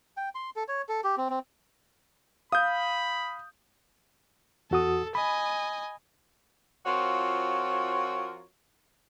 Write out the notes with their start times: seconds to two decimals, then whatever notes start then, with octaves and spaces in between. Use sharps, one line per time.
0.17 G5
0.35 C6
0.56 A4
0.68 C#5
0.89 A4
1.04 G4
1.17 C4
1.30 C4
2.52 F5 B5 D#6 G6
4.71 E2 F#4 A4 D#6
5.15 D#5 G#5 B5
6.85 F3 C4 F4 F#4 A#4 C#5